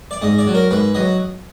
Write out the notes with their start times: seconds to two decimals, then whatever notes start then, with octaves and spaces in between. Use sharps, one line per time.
0.11 D5
0.22 G#2 D#5
0.39 D5
0.47 F#3
0.55 A#4
0.71 G#2 B4
0.95 F#3 D#5